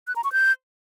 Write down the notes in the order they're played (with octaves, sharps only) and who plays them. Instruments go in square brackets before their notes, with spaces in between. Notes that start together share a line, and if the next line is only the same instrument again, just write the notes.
[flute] F#6
A#5
C#6
G6